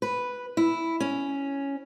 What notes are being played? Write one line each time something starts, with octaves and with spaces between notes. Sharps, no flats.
B4
E4
C#4